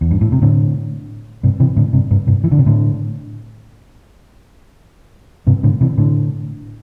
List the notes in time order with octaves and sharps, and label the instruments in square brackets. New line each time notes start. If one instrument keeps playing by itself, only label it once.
[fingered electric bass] E2
G2
A2
C3
A2 D3
G2 C3
C3 E3
A2 D3
G2 C3
G2 C3
G2 C3
E3
D3
C3
A2 D3
G2 C3
A2 D3
C3 E3
A2 D3